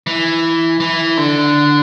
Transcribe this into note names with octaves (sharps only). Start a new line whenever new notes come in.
E3
E3
D3